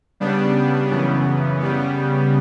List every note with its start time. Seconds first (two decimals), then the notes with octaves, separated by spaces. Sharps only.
0.20 C#3 G3 B3 D4
0.91 F#2 C#3 E3 B3
1.60 C#3 G3 B3